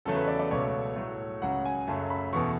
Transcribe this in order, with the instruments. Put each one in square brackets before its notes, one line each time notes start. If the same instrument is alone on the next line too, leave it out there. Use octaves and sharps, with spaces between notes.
[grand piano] E2 C#3 F#3 A3 A4
B4
D5
D5
C#2 B2 F#3 A3 C#5
A2 F#3 A3
C#2 C#3 F#3 F#5
G#5
F#2 C#3 F#3 A3 A5
B5
E2 B2 A3 C#6